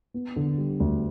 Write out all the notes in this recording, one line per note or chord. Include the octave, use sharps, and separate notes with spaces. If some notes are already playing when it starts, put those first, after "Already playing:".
B3
D3
G3
D2